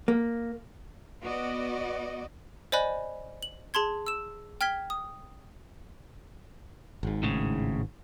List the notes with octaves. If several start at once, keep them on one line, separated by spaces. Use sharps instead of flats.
A#3
B3 F#4 D5 D#5
C5 D5 D#5 G#5 B5 F#6
F#7
G#4 A5 C6 G#6
E6 E7
G5 F6 G#6 B6 G7
D#6
G#1 G#2
A2 C#3